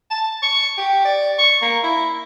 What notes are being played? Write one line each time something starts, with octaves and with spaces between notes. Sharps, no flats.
A5
C#6
G4
D5
C#6
A#3
E4